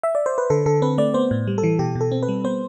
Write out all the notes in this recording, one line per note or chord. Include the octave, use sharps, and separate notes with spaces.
E5
D5
C5
B4
D3 A4
D3 A4
C4 B4
A3 D5
B3 C5
A2
G3
A4
E3
B2 G4
B2
A4
C4
B4
G3
B3 C5